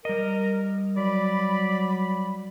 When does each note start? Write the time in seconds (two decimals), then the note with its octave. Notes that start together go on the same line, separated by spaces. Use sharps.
0.05 G3 A#4 D#5
0.97 F#3 D5 B5